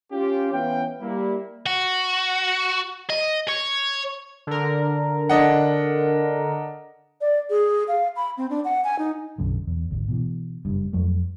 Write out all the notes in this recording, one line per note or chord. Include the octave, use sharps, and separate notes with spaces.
C#4 F4 G4
E3 B3 C#4 E4 F5 G5
G3 A#3 E4
F#4
D#5
C#5
D3 A#4
D4 D#5 F#5
D5
G#4
F5
B5
C4
D4
F#5
G#5
D#4
B1 F#2 D3
E2
G#1 D2
B2 E3
F#1 G2
F2 F#3 A3